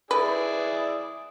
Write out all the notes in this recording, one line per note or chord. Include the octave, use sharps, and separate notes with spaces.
E4 G#4 B4 D5